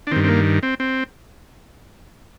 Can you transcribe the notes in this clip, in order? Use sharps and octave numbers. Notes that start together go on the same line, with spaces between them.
D4
G2 D#3 C4
C4
A#3
C4
C4